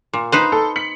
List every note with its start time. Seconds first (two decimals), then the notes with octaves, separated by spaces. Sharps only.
0.13 A#2
0.32 D#4 B4 C5
0.52 A4
0.76 B6 C#7 F#7